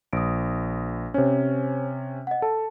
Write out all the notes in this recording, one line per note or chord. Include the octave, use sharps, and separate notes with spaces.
A#1 D#6 D7
C3 C#4 C5 C#5
D#5 F#5
A4 A5